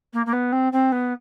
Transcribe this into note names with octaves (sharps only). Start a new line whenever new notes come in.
A#3
A#3
B3
C4
C4
B3